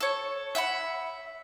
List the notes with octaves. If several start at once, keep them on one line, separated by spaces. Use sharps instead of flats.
A4 C#5
E5 F#5 G5 B5